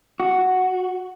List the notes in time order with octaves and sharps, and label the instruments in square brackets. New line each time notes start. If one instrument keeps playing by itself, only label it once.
[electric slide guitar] F#4